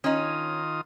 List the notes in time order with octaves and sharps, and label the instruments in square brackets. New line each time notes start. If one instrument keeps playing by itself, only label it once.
[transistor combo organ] D#3 F4 D#6 [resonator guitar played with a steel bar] C#4 D#4